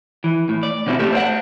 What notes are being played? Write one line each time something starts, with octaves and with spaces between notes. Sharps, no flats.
E3
A2
D5
B2 D3 C4 E4 F#4
A3 A#3 G4 A4
C5 D5 E5 F#5